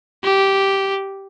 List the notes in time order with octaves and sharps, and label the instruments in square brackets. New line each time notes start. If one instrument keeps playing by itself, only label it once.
[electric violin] G4